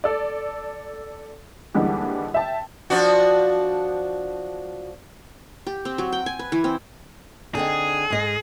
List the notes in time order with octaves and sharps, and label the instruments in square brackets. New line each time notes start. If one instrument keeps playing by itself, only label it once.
[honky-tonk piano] A4 D5
D#2 D3 E3 G3 G#3 G4
E5 G5 A5
[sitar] F3 D4 F#4
[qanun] G4
C4
F#3
G5
G#5
B4
E3
C4
[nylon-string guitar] D3 C4 D#4 [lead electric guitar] G#4
[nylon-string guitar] G#2 D#5